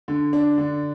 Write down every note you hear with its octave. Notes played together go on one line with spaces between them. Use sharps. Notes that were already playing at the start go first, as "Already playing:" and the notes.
D3
D4
D3